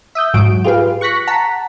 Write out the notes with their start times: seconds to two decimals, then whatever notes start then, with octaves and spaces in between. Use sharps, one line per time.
0.15 E5 D#6 G6
0.34 G#2 F#3 F#4 D7
0.64 F4 G4 G#4 B4 F5
1.01 C#6 F#6 A#6 B6 C#7
1.27 F#5 A5 A#5 B6